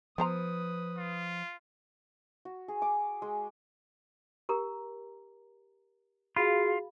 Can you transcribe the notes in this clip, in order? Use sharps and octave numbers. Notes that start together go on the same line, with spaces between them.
F3 B3 B4 C5 A#5 D#6
F4
F#4
G#4
D6
G#3
G4 A#4 A#5
F4 F#4 G#4 F5 B5